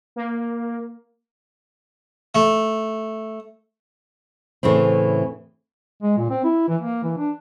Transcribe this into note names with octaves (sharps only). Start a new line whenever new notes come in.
A#3
A3
A2 C#3 E3 C4
G#3
A#2
C4
E4
E3
A#3
E3
D4